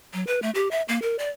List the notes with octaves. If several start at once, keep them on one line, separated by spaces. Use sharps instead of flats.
F#3
B4
A3
G4
E5
A#3
A#4
D5